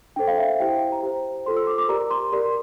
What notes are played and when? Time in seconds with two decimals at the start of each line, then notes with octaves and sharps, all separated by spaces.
0.16 D4 A4 C5 G5
0.28 F5
0.38 E5
0.49 E5
0.60 E4 G4 C5 G5
0.71 G5
0.92 A#5
1.03 G4 C5
1.46 F4 A4 C5 C6
1.57 E6
1.67 D6
1.78 D6
1.89 G4 A#4 D5 A#5
2.10 C6
2.32 G4 A#4 D5 C6